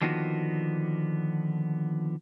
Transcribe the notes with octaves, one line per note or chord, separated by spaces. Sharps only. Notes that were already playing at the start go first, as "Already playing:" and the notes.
D3 D#3 F3 A#3 B3 F#4